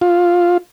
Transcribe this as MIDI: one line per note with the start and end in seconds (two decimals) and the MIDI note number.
0.01 0.57 65